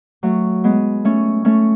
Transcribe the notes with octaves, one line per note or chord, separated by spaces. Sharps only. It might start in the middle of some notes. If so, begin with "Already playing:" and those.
F#3 A3
G#3 B3
A3 C#4
A3 C#4